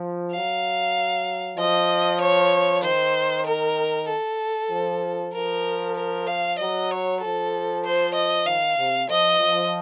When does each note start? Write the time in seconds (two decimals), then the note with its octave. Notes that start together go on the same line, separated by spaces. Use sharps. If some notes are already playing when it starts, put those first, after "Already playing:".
Already playing: F3
0.32 F#3 F5
1.58 F3 D#5
2.21 C#5
2.83 D#3 C5
3.46 A#4
4.08 A4
4.70 F3
5.33 F3 A#4
5.95 A#4
6.27 F5
6.58 F#3 D#5
6.90 C#5
7.21 F3 A4
7.84 C5
8.14 D#5
8.46 D#3 F5
8.77 C3
9.09 F3 D#5
9.40 F3